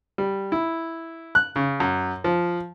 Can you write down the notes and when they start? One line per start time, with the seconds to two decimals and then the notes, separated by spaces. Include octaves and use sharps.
0.18 G3
0.52 E4
1.35 F#6
1.56 C#3
1.80 F#2
2.24 F3